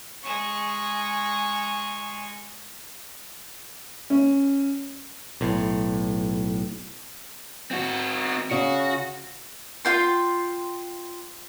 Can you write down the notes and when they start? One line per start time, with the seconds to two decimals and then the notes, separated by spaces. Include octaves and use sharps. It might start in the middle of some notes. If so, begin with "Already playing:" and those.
0.23 G#3 C#6
4.10 C#4
5.41 B1 A2
7.71 C4 F#4
8.51 C#3 F#4
9.85 F4 G5 C6